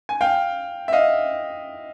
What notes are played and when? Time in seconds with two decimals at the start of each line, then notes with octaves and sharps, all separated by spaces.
0.09 G#5
0.21 F5 G5
0.88 E5
0.93 D#5 F5